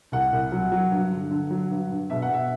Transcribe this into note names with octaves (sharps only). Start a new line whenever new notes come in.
C2 F#5
C2
F#3
F#3
G2
D3
D3
F#3
G2
G2
B2 E5
F#5
B2 E5